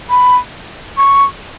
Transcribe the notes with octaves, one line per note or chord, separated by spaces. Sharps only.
B5
C#6